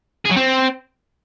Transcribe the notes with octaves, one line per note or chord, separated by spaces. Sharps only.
G#4
F#3
C4